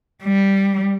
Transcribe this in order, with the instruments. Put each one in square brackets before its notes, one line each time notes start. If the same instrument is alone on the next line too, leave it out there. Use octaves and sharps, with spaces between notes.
[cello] G3